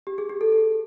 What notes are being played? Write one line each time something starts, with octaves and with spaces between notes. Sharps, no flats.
G4
G#4
G4
A4
A4